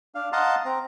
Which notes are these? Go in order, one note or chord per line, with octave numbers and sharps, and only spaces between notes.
D4 F5
D#5 F5 F#5 A5 A#5 C6
C4 A#5